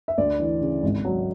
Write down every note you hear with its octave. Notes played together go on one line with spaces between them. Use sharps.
E5
D2 D5
E3
C#3
G#1
F#3